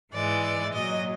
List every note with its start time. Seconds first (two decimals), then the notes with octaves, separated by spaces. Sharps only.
0.13 G#2 E3 G#3 D5
0.73 A#2 F#3 D#5